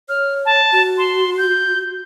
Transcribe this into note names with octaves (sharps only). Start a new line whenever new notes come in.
C#5 F6
A5
F#4
C6
G6